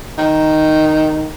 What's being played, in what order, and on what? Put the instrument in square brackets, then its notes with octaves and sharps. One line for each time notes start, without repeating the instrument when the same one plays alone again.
[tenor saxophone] D#3